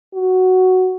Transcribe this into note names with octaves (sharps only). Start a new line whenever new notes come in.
F#4